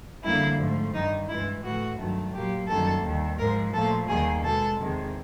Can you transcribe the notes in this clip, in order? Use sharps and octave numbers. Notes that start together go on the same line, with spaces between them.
F2 D3 G3 A#3 E4
G#2 F3 A3
G2 D#3 G3 D#4
G2 E3 G#3 E4
A2 E3 A3 F#4
G2 D#3 F#3 A3
A#2 F#3 A#3 G4
F#2 D#3 G3 A#3 A4
D#2 D#3 G3
G#2 F3 G#3 A#4
A#2 F3 A3 A4
D#2 D#3 G3 A#3 G#4
B2 G#3 A4
E2 C3 D#3 G#3